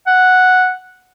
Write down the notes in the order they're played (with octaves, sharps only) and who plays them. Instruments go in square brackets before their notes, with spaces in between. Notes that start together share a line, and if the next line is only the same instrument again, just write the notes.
[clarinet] F#5